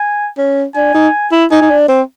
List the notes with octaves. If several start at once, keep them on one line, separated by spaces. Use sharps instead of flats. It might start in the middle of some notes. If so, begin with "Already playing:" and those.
Already playing: G#5
C#4
D4 G#5
D#4
E4
D#4 G#5
D#4
D4
C4